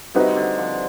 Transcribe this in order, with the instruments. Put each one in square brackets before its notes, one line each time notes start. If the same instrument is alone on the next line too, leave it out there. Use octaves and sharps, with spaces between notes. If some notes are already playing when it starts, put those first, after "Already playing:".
[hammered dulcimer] C3 [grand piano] G3 C4 D#4 F#4 B4
[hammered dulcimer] D3
F3